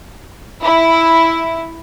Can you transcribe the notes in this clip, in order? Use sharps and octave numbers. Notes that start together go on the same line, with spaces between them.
E4